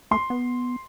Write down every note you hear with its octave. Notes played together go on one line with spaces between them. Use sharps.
A3 C6
B3